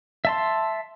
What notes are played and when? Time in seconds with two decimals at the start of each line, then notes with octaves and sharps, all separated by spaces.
0.25 E5 A5 C6